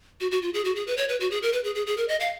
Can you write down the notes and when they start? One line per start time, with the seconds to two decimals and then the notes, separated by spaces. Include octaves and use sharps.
0.20 F#4
0.31 F#4
0.42 F4
0.54 G#4
0.65 F#4
0.76 G#4
0.87 B4
0.97 C#5
1.09 B4
1.20 F#4
1.31 G#4
1.42 A#4
1.53 B4
1.64 G#4
1.75 G#4
1.87 G#4
1.97 A#4
2.08 D#5
2.20 F5